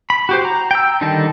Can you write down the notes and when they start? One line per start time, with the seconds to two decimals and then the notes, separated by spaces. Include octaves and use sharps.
0.10 B5
0.29 F#4 G4 C5
0.45 A#5
0.71 G5 E6
1.01 D3 D#3 G3 D#4 A5